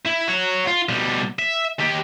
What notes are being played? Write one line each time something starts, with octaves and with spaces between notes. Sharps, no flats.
E4
F#4 C#5
F4
B2 G3
E5
D#3 G4